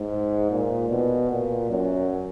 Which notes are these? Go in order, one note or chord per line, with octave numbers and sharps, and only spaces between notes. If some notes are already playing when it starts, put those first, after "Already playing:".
Already playing: G#2
A#2
B2
A#2
F#2